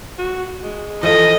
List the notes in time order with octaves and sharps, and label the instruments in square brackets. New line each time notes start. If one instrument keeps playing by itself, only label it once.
[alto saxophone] F#4
G#3
[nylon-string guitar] E3 A4 [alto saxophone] F3 [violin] D#5